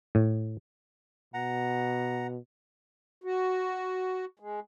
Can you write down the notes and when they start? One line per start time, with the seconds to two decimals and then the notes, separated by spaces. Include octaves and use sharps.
0.15 A2
1.34 B2 F#5 A#5
3.24 F#4
4.40 G#3